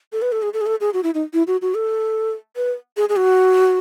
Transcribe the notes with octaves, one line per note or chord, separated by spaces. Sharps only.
A4
B4
A4
G#4
A4
G#4
A4
G#4
F#4
E4
D#4
E4
F#4
F#4
A4
B4
G#4
G#4
F#4